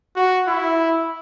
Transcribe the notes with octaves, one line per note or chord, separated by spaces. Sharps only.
F#4
E4